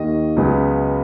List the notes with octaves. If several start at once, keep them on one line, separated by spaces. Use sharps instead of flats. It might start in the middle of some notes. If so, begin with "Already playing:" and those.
Already playing: D#2 D#3 A#3 D#5
C#2 C#3 F#3 B3